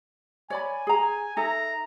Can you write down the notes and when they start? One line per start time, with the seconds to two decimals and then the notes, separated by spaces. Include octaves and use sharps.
0.50 C#5 D5 G#5 B5
0.87 G#4 A#5
1.37 D#4 A4 E5 A#5